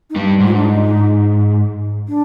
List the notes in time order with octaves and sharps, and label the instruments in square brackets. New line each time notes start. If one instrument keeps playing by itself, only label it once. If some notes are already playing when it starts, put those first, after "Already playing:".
[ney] D#4
[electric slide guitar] G2 G3
G#2
[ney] F4
D4
D#4
D4